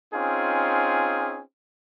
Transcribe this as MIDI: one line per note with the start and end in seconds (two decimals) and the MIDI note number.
0.14 1.42 60
0.14 1.42 61
0.14 1.42 63
0.14 1.42 65
0.14 1.42 68